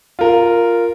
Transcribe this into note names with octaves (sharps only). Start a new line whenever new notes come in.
F4 A#4